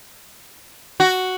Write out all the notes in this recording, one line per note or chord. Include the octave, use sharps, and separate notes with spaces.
F#4